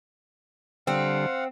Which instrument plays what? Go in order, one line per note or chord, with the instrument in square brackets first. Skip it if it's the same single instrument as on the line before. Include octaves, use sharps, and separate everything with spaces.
[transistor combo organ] D3 G3 [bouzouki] C4 [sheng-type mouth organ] F5 F#5